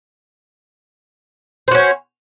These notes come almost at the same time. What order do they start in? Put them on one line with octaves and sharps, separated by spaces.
C5 F#4 C#4